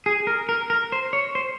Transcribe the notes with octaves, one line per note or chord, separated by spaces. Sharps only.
G#4
A#4
A#4
A#4
C5
C#5
C5